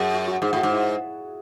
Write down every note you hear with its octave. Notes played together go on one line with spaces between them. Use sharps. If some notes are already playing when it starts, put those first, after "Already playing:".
Already playing: F#2 G#4
F#4
F#4
G#2 G#4
A2 F#4
G#2
E4